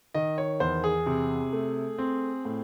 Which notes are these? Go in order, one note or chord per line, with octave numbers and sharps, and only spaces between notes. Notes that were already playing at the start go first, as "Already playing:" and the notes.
D#3 D#5
C#5
E2 C5
G#4
C3
A3
C4
A2